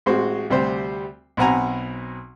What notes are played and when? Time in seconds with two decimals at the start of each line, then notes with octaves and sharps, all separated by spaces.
0.06 A1 G#3 C4 F#4 C5
0.50 D2 C3 G3 C5
1.37 B1 B2 C4 F#5 G#5 A#5